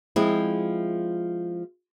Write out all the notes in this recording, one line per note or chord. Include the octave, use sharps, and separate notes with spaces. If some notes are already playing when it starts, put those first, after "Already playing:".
F3 G#3 C4 E4